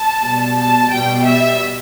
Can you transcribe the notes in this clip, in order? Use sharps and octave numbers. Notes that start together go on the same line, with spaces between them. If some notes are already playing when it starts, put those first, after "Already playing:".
Already playing: A5
B2 G3
A5
B2 G3 G5
E5